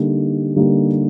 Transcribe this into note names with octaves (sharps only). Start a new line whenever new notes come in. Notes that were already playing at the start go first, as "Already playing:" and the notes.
Already playing: D3 G3 A#3 D#4 G4
D3 G3 A#3 D#4 G4